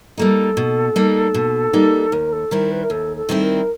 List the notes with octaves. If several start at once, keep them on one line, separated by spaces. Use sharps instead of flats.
G3 A#3 D#4 A4
B2
G3 A#3 D#4
B2
G3 A#3 D#4
D#2 A#4
A4
D#3 G3 C4 E4 A#4
B4
A#4
D#2 A4
A4
D#3 G3 C4 E4
A#4